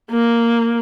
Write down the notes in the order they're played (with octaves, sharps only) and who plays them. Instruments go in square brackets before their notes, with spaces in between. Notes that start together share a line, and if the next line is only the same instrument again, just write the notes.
[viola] A#3